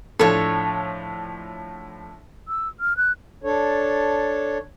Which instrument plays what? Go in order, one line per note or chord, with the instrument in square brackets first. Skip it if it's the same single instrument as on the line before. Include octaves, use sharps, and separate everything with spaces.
[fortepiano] A2 F3 D4 [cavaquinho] A4 C#5
[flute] E6
F6
F#6
[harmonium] D4 A4 C#5